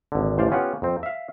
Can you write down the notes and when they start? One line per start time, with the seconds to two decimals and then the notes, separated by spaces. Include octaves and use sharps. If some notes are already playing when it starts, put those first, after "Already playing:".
0.12 G#1 D3
0.38 A1 C5 D5 F5
0.51 B3 C#4 F4 G4 F#5
0.82 F2 C4
1.03 E5 F5